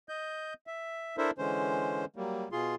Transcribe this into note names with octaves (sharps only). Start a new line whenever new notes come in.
D#5 G6
E5
D4 E4 A4 A#4 C5 E5
D3 E3 G#3 C#4 C5
F#3 G3 A#3
B2 F4 G#4 C6